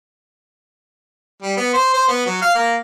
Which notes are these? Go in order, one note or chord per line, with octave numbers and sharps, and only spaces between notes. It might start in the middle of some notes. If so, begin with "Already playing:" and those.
G3
B3
C5
C5
B3
F#3
F5
A#3